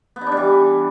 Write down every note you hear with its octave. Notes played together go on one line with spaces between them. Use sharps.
B3
D#4
D4
G3
E3